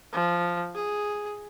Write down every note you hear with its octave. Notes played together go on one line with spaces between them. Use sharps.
F3
G#4